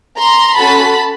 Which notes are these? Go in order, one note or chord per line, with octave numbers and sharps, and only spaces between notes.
A#5 C6
C#4 F#4 A4 A5 B5